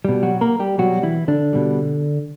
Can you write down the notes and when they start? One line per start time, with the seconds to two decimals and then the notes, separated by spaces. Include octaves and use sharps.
0.05 B2 G3
0.23 F#3 F#4
0.41 A#3 A#4
0.60 G3 G4
0.78 B2 F#3 G3 F#4
1.03 E3 E4
1.28 D3 D4
1.53 B2 G3